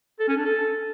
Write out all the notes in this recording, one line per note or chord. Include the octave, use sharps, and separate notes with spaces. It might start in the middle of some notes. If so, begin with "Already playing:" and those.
A4
C#4
D4
A4